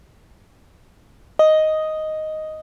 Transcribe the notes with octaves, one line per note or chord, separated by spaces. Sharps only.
D#5